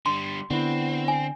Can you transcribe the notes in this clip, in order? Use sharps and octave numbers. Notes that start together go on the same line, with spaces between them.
D3 G3 C6
D3 B3 C4 E4
G#5